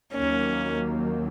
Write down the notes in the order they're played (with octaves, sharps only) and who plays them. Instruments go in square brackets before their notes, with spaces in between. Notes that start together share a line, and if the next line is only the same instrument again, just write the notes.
[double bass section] D#2 D#3 F#3 A#3 [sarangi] C#4